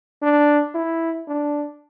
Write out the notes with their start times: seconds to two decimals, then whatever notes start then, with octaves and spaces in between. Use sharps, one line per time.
0.23 D4
0.75 E4
1.28 D4